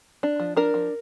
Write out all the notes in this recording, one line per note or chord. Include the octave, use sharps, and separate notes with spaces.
D4
F3
D4 A#4
F3